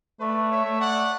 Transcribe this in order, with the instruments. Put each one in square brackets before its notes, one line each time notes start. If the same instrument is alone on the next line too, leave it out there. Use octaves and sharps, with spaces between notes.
[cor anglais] A3 [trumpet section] B4 D5
[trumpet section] C#5 E5
[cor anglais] A3
[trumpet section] D5 F#5